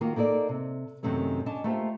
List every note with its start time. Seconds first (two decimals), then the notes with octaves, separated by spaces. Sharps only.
0.01 D#3 A#3 F4 F#4
0.16 A#3 D#4 A4 C5 D5
0.49 C3
1.03 F#2 C3 D#3 F#3 A3 C#4
1.46 C#4 D4 D#5 A5
1.64 A3 A#3 F4 G4 C5